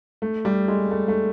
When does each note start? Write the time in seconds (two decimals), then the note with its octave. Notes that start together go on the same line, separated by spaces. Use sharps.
0.22 A3
0.45 G3
0.68 G#3
0.91 A3
1.08 A3